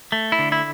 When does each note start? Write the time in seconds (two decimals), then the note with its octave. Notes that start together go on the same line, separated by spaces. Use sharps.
0.12 A3
0.32 E4
0.39 D3
0.52 E4